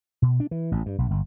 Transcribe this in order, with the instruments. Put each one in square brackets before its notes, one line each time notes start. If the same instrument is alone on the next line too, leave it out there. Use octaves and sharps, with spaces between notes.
[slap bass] B2
D4
E3
A1
G2
B1
G1